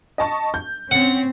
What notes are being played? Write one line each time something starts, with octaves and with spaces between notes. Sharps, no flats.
D#5 A5 C#6
G6
C4 C#4 F#5